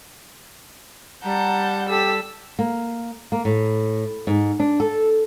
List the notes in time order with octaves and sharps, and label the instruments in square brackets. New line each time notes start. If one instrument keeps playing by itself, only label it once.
[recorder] G3 [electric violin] F#5 [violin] A5 G6 [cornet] A#5
[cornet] G4 [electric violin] A4 [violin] E6 B6
[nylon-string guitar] A#3
A#3
A2
G#2
D4
A4